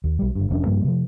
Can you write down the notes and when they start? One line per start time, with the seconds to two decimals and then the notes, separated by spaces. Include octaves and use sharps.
0.04 D#2
0.19 B1 G3
0.35 G1 G2
0.50 F1 F2 C#4 D4
0.66 G2 F3 G3 A#3
0.84 C3 F3